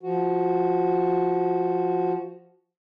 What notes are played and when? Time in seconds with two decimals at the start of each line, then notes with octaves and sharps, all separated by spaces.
0.03 F3 F#4